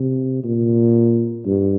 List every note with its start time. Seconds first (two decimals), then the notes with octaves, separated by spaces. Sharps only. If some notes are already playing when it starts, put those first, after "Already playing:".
Already playing: C3
0.44 A#2
1.46 G2